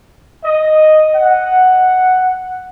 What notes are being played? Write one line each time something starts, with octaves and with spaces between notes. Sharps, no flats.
D#5
F#5